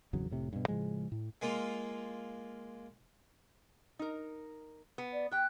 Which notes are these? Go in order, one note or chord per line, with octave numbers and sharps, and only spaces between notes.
G#1 E2 C#3 F#3
F1 A2 C3
G2 B2
A2 C#3 F3 G#3
A2
G#3 A#3 F4
D#4 A#4
B3
D5
G4 G5 F#6